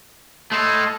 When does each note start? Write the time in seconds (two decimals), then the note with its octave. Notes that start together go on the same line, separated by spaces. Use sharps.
0.52 A3 E4 D#5 C6